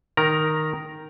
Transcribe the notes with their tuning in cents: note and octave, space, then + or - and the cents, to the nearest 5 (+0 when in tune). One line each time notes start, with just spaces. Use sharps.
D#3 +0 A#4 +0 A#5 +10